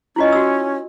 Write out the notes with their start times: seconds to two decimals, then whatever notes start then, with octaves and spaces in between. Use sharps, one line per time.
0.16 C#4 E4 F4 D#5
0.32 F#4 E6